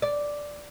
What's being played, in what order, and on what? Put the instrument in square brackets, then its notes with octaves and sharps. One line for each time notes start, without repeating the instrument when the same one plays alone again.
[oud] D5